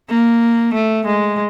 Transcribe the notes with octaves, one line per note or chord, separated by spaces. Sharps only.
A#3
A3
G#3